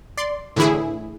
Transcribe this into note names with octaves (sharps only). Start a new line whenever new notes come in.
D5 C6
A2 D3 E3 E4 G#4